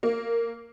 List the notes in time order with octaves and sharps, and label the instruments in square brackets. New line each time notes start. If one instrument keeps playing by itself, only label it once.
[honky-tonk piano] A#3